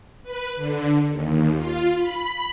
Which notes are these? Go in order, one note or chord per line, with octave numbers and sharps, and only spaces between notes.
B4
D3
D#2
F4
B5